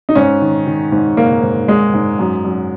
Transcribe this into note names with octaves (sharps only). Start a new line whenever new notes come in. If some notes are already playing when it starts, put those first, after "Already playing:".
D#4
G#2 C#4
D#3
D#3
G#2
G#2 A#3
G#2
G#2 G#3
G#2
F#2
F#2